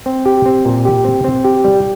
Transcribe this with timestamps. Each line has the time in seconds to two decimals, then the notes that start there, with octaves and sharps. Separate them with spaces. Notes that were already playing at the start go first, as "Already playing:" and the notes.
0.06 C4
0.25 G4
0.46 C4
0.65 A#2
0.85 G4
1.04 C4
1.24 C4
1.44 G4
1.64 G3